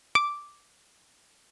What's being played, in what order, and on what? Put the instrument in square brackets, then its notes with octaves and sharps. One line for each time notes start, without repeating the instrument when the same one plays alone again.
[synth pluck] D6